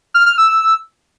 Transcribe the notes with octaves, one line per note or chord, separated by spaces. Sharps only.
F6
F6
E6